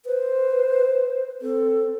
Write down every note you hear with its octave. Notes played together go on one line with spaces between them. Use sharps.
B4 C5
C4 A4